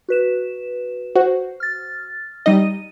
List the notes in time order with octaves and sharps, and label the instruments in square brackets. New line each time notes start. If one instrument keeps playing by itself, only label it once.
[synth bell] F#4 B4 E7
[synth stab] F#4 [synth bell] C5
[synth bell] F6 A6
[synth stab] G3 D#4 D#5 [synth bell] D#7